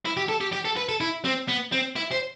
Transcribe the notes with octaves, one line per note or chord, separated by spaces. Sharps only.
E4
G4
A4
G4
G4
A4
B4
A4
E4
C4
B3
C4
E4
C5